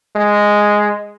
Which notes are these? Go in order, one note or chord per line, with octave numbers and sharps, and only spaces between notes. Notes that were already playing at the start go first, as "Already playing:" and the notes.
G#3